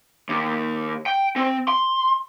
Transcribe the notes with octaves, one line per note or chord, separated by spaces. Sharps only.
D#2
G5
C4
C6